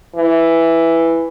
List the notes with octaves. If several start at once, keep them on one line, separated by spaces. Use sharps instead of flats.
E3